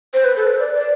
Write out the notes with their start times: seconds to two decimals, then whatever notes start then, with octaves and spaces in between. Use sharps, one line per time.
0.14 C5
0.25 B4
0.36 A4
0.47 B4
0.59 D5
0.75 D5